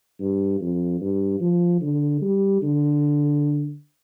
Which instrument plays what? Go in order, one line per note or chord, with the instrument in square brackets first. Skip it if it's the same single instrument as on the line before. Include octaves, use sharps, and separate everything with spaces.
[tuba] G2
F2
G2
F3
D3
G3
D3